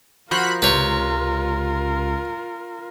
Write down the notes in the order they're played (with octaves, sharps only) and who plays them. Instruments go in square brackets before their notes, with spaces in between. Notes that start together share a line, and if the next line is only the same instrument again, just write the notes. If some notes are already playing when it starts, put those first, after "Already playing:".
[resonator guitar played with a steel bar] F3 [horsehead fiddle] F4 A#4 [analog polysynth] F#4 B5 F#6
[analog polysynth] C#2 [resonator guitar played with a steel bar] C3 [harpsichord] B4 C#5